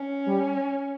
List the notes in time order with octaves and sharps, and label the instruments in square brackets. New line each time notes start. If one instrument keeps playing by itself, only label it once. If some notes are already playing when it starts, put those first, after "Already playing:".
Already playing: [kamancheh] C#4
[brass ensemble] G3